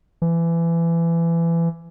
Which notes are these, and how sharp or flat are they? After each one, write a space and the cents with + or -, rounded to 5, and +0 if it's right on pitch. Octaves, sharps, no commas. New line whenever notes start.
E3 +25